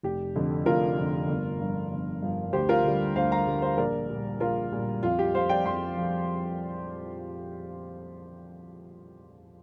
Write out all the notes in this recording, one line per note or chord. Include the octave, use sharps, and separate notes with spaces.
F1 G4
F2 D3
F1 F4 A#4
F2 D3
G1
G2 F3
G1
G2 F3
D2 G4 C5
F4 A#4
D3 G3
D2 C5 F5
F5 A#5
D3 G3
C5 F5
A#1 A#4 D5
A#2 G3
A#1 F4 A#4
A#2 G3
F2 F4
G4
F3 C5 F5
D5 G5
F2 G5 C6
F3